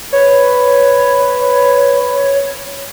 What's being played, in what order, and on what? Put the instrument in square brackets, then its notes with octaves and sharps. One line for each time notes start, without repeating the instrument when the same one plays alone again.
[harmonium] B4 [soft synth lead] C#5